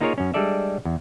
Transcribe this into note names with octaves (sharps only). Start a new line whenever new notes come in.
A#3 D#4 F4 G#4 A#4 C#5
F#2 C#4
G3 G#3 D4 A4 D5 E5
E2